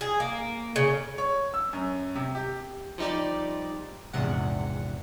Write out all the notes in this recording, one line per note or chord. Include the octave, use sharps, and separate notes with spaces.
G#4
A#3
C#3
C#5
E6
F#2
C3
G4
F3 G3 D#4 G4 D5
A#1 E2 G#2 C3 F#5